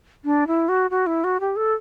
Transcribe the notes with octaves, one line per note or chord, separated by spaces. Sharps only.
D4
E4
F#4
F#4
E4
F#4
G4
A4